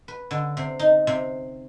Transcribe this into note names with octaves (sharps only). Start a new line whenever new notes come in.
B4
D3
C3
D#4
C3